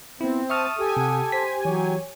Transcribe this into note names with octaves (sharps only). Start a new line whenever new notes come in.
B3 C4 E4
E5 A5 C#6 D#6 F6
G4 A4 G#5
C3 F#5
C5 B6
E3 F#3 C#5